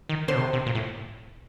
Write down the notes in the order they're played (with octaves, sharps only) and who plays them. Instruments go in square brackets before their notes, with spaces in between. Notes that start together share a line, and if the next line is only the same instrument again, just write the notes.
[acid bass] D#3
[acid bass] D3 [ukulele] C5
[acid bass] B2
C3
C3
A#2
A2